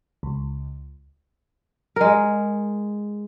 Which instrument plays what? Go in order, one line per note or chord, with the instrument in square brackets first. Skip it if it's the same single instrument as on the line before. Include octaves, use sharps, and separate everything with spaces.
[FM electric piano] C#2
[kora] G#3 A#4